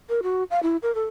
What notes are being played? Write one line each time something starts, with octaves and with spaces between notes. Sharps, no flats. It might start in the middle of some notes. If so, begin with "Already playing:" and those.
A#4
F#4
F5
E4
A#4
A4